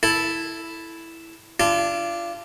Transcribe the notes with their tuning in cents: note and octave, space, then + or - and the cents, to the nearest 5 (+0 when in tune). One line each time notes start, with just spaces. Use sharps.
E4 +0 A4 +0
D4 +0 F4 -30